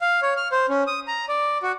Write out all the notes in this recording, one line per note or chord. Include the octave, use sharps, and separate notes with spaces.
F5
C#5
F6
C5
C#4
D#6
A#5
D5
F#4